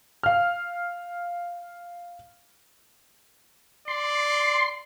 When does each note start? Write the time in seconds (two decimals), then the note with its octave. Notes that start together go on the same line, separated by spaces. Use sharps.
0.23 F5 F6
3.88 D5 C6